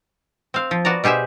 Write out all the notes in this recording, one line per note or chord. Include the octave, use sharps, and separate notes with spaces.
C4 F5
F3
B3 F#4 D5 A#5
B2 G4 G#4 C5 E5